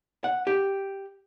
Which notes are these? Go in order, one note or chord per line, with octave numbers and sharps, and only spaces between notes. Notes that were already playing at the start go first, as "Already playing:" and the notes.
F#5
G4